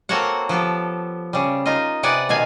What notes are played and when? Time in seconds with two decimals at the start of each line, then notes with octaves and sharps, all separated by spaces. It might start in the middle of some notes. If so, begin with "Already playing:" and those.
0.09 A#3 C4 F#4 A4 C#5 F#5
0.49 F3 B3 G4 A4
1.33 C#3 G3
1.66 D#4 F4 A#4 D#5
2.03 C3 B4 D5 F#5 G#5
2.29 B2 D#3 F5 G#5